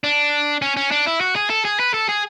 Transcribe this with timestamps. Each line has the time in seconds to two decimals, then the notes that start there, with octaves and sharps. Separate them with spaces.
0.04 D4
0.62 C#4
0.77 C#4
0.91 D4
1.06 E4
1.21 F#4
1.36 G#4
1.50 A4
1.65 G#4
1.80 B4
1.94 A4
2.09 G#4